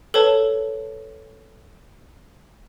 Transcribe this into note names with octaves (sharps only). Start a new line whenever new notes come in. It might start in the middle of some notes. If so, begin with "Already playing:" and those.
A4 B4 C#5 A5